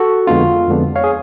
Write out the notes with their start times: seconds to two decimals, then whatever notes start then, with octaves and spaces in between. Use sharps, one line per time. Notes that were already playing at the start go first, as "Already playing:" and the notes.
Already playing: F#4 A4
0.27 F2 D3 G#3 B3 D4 F4
0.68 F2 D3 G#3 B3 D4
0.96 C#5 F5
1.04 G#4